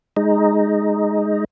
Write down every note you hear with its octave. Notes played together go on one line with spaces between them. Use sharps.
G#3 D#4